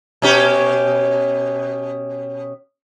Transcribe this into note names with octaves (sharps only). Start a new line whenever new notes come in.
B2 C#4 G4